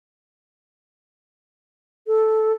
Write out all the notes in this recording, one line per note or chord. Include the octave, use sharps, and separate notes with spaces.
A4